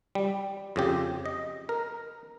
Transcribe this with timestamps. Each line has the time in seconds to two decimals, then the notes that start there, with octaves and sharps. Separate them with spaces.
0.15 G3
0.76 F2 C#3 G4
1.26 D#5
1.69 A#4